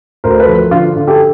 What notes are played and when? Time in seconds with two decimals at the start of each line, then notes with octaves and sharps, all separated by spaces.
0.24 D2 A#4 C5
0.40 A4 B4
0.48 F3
0.71 D3 F4
0.96 D3
1.07 G4 A4